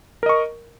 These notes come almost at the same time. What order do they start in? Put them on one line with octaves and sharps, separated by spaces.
A#4 D#5 C#6